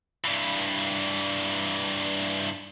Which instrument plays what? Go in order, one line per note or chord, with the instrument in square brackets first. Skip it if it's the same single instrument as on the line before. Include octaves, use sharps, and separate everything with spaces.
[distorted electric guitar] G2 E3